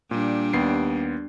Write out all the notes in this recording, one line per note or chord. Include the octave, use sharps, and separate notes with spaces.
A#2 G3 D4
D#2 B3 C7